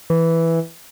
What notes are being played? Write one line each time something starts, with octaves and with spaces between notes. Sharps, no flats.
E3